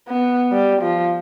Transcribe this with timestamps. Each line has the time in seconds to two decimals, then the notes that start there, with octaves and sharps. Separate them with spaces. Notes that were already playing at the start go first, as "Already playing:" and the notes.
0.08 B3
0.52 G3
0.82 F3